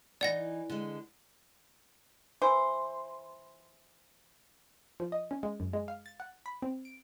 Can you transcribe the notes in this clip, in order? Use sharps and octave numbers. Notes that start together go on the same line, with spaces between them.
E3 D#4 D5 F#5 A#6
D3 G#3
E3 C5
F3
D#5
C#4
G#3
F#2
G#3
F5
A6
F#5
B5
C4
D7